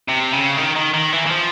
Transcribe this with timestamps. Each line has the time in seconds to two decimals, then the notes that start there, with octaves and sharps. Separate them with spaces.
0.09 C3
0.33 C#3
0.58 D#3
0.76 D#3
0.94 D#3
1.13 E3
1.26 E3
1.31 F3